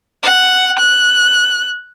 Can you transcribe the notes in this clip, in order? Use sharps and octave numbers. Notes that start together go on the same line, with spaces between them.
F#5
F#6